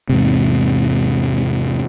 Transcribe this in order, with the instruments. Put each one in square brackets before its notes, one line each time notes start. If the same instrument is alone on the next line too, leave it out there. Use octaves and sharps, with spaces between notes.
[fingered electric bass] E2 G#2 C3